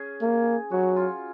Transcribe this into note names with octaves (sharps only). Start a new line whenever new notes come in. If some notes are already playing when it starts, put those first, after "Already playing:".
Already playing: C#4 G#4
A#3
F#3 F#4
F4